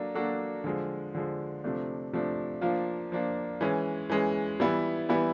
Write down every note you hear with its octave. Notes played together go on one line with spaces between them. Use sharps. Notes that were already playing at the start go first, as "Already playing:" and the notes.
Already playing: F#3 A#3 D4 A4
F#3 A#3 D4 F#4 A4
D3 F3 G#3
D3 F3 G#3
C3 F3 A3 D4
C3 F3 A3 D4
F3 A#3 D4 F4
F3 A#3 D4 F4
E3 G#3 C#4
E3 G#3 C#4
E3 G3 B3 E4
E3 G3 B3 E4